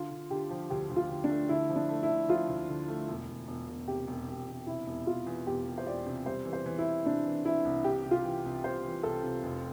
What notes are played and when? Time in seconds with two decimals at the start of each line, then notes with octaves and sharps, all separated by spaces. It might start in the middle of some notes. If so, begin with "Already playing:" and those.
Already playing: D3 F4
0.11 D3
0.31 D3 G4
0.50 F3
0.70 D2 G4
0.90 D2
0.96 F4
1.10 D2
1.24 D4
1.30 A3
1.49 D3 E4
1.70 F3
1.76 D4
1.89 A3
2.03 E4
2.09 D3
2.29 F3 F4
2.49 D2
2.69 D3
2.88 A3
3.08 E1
3.28 E1
3.48 E1
3.68 E1
3.88 C3 G4
4.07 E1
4.27 E1
4.48 E1
4.67 C3 E4
4.86 E1
5.07 E1 F4
5.26 E2
5.47 E1 G4
5.66 E1
5.78 C5
5.86 E1 D5
6.06 C3
6.26 G3 C5
6.45 E3
6.53 C5
6.66 E3
6.78 E4
6.86 E3
7.05 C3 D4
7.26 E3
7.45 E3 E4
7.65 C2
7.84 C3 G4
8.05 C3
8.11 F4
8.24 E3
8.45 C2
8.64 C2 C5
8.84 E3
9.03 C2 A4
9.23 C3
9.43 F1